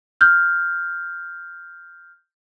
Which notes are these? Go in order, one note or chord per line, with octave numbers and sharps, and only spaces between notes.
F6 G6